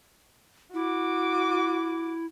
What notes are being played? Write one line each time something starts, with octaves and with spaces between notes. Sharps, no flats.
E4 F#4 D6